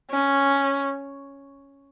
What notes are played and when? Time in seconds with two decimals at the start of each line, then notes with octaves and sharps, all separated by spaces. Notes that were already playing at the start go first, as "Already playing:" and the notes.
0.11 C#4